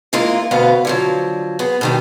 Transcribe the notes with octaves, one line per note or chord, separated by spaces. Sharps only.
E3 G#3 A#3 F4 A#4
D2 B2 B3 F5
D3 F3 F#3
B3 G#4
B2 D#3 G3